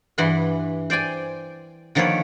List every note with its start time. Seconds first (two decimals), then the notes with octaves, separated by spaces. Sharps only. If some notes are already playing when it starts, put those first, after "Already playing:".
0.18 G2 E3 B4 F#5 C6
0.90 C5 D5 G5 G#5
1.95 D3 D#3 F3 A#3 B4 C#5